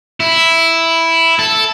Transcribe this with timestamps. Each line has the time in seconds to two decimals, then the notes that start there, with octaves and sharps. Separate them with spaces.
0.20 E4
1.39 A4